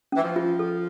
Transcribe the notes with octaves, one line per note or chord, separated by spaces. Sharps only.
E3 C#4
F3
F4
A4